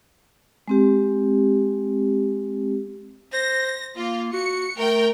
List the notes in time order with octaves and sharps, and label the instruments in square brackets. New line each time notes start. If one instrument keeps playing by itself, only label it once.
[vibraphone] G#3 C4 G4
[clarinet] C5 [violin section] A#6
[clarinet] A#3 [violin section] F4
[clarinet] F#4 [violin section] C#7
[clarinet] A3 [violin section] A#4 G5